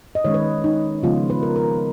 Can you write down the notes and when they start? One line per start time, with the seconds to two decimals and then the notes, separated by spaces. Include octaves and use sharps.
0.15 D#5
0.24 D#3 G#3 C#4 C#5
0.34 B4
0.64 D#4
1.03 C#3 F3 G#3 B3 F4
1.30 B4
1.43 A#4
1.56 A#4